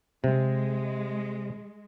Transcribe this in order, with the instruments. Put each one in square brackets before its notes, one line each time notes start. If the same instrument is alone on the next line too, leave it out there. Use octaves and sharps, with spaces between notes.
[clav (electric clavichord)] C3 [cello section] G#3